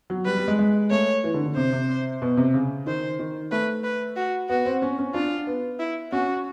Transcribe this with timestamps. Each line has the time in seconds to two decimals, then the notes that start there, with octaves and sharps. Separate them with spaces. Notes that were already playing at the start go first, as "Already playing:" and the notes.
0.10 F#3
0.25 G3 B4
0.37 G3
0.48 G#3
0.59 G#3
0.91 A3 C#5
1.24 E3
1.34 D3
1.46 D3
1.56 C3 C5
1.73 C3
2.22 B2
2.37 C3
2.54 C#3
2.86 D#3 C5
3.19 D#3
3.52 A3 B4
3.84 B4
4.16 F#4
4.49 B3 F#4
4.66 C4
4.82 C#4
4.99 C#4
5.14 D4 F4
5.47 B3
5.79 E4
6.12 C#4 F#4